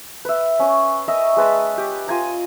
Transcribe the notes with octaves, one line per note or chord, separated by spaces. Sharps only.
B4 E5
C#4 C#5
A#4 D#5 E5 A#5
G#3 B4 A5 B5
G4
F4 G#5 A#5